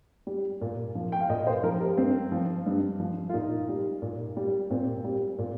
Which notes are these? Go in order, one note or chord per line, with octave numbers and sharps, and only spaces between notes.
G3
A#2
F3
G5
F5
A#2 D#5
C5
F3 A#4
G4
G2 C4
F3
G2
F3
F4
A#2 D#4
G3
A#2
G3
A#2 C4
G3
A#2